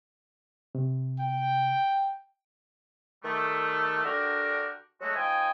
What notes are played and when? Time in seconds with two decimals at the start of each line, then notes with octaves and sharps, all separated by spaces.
0.75 C3
1.19 G5
3.24 D#3 G3 A3
4.04 D3 D4 F#4 G4 A#4
5.01 F#3 G#3 A3 E4 F#4
5.15 F3 D#4 G5 G#5